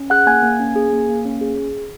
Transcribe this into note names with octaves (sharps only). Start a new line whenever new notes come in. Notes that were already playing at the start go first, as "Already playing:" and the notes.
Already playing: C#4
G#4 F#5 F#6
A#3 G#5 G#6
A#3
C#4
G#4
A#3
A#3
C#4
G#4